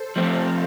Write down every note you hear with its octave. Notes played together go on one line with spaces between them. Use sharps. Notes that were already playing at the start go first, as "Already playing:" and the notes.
Already playing: A4 C5
F3 A3 C4 F5